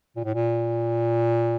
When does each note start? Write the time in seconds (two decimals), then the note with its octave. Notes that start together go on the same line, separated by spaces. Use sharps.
0.16 A#2
0.25 A2
0.34 A#2